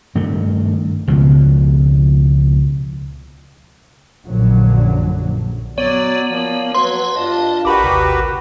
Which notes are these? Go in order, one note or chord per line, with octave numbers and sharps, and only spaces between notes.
G2 D#3 A3
C#2 B2 F3
A#1 F#2 D3 F#3
F#3 B3 C#5 D5
F3 A#3
F#3 B4 C#5 C6
G2 D4 F4 D#5 A5
A1 F#4 G4 A#4 B4 F#5 B5 D6
A1 D#2 C3